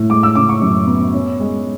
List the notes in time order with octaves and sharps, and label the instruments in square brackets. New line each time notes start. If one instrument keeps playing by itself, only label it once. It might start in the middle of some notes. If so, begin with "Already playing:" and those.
Already playing: [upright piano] A2
G#3 D6
E6
C#3 D6
C#6
F#2
B3
C#4
G#3